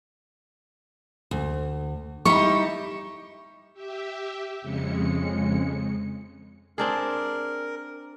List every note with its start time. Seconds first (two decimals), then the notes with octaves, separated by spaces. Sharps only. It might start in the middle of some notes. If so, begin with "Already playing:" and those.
1.31 D2
2.25 G3 D#4 E4 B5 C#6
3.74 G4 E5
4.62 F2 C#3 G#3 C#7
6.78 C4 D4 G#4 A#4